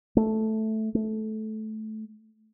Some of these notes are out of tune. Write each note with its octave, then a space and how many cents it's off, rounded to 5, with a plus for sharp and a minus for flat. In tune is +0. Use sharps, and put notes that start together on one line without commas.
A3 -5
A3 -15